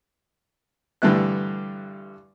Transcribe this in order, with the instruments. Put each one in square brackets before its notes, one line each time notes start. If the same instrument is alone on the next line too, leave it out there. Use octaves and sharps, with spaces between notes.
[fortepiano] G2 D3 E3 A3 F#6